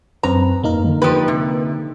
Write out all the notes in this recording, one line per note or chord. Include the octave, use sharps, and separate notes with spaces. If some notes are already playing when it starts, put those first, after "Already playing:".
F#2 C4 B4 A#5
F2 A#3 D#4 A#4
D3
F3 G4 B4
C3